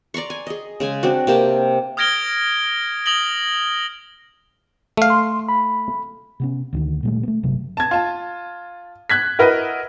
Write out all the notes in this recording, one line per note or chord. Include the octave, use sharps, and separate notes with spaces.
D5 A#5 C6 C#6
G#5
G#4 D#5
C#3 G#3 G#5
C4 D4 F#4
C3 A#3 G4 A5
D#6 F6 G#6 A#6 D7 G7
D#6 A#6 F#7 G7
A3 F5
C6
B5
C3 B3 C#4
D2 D3 D#3
A#2 G3 A3
A3 B3
G1 C3 F#3
A5 G#6
F4 A5
F#6 G#6 B6
E4 F#4 A#4 B4 D#5